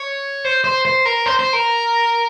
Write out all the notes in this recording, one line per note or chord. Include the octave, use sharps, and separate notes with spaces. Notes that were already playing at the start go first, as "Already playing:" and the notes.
Already playing: C#5
C5
C5
C5
A#4
C5
C5
A#4